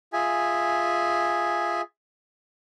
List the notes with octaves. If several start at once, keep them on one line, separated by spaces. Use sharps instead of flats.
F4 G#4 E5 G#5